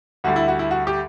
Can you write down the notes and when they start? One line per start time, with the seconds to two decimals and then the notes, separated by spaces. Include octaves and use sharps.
0.24 D2 D3 G3 F#4
0.36 E4
0.48 F#4
0.59 E4
0.71 F#4
0.87 G4